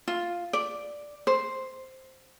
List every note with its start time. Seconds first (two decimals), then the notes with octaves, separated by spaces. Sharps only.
0.08 F4
0.53 D5
1.27 C5